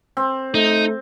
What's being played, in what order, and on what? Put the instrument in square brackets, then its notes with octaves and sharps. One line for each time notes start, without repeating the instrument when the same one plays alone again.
[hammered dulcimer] C4
[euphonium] A3 [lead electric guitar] D#4